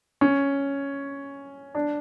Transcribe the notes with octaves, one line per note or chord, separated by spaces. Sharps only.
C#4
D4